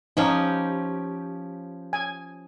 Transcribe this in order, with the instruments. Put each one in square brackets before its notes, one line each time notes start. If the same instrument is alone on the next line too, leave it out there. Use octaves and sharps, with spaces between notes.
[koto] F3 C#4 G4 [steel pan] D#4
[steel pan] G#5